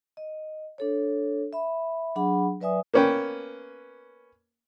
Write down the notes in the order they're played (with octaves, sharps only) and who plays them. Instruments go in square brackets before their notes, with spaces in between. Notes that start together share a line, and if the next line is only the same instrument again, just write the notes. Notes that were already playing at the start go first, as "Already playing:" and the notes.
[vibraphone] D#5
D4 A4 C#5
E5 B5
F#3 D4 G#4 F#5 B5
F#3 B4 D5 E5 G#5 D#6
[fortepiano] A#3 B3 C#4 B4 G5